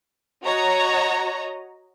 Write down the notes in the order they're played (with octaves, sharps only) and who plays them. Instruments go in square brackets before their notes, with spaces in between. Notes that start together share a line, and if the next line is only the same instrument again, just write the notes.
[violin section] F#4 C#5 D#5 A#5